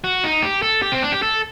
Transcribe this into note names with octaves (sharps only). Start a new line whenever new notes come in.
F#4
D#4
G4
A4
G4
C4
D4
G4
A4